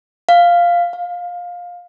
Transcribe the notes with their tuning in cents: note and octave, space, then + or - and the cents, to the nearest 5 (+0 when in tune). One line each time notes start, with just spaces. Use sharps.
F5 -5
F5 +20